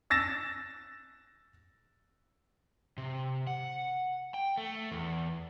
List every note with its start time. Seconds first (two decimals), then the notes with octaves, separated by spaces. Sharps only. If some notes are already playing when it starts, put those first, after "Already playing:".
0.10 E6 A6 A#6 E7
2.98 C3
3.47 F#5
4.34 G5
4.57 A3
4.92 E2